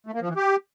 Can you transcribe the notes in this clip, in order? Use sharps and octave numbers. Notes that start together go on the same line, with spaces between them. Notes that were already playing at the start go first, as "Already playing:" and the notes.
A3
A#3
F3
E3
G4